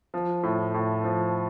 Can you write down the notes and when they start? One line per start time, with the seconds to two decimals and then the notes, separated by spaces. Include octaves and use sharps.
0.14 F3
0.43 A2
0.74 A2
1.04 F3